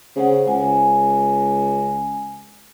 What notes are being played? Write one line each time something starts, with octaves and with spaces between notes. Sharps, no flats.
C#3 C5 F#5
C#2 G#5